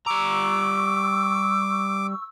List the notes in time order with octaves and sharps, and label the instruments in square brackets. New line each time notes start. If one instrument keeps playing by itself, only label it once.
[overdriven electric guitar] G3 A#5 [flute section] C#6 E6 [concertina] D6